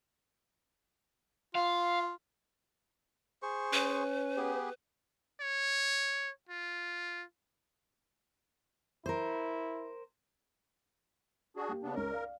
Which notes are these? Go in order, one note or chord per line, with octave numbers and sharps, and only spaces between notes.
F4 F5
G#4 C5 C#6
C#4 B4
B3 G4 G#4
C#5
F4
E4 A#4 C5
D4 F#4 G#4
A#3 G4
C#3 B3 D4
C#2 A#4 C#5
D5 F5